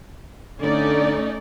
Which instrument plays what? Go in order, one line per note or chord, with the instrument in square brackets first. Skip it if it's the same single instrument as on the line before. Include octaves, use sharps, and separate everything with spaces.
[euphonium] D3 [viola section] A3 C#4 D#4 [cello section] D5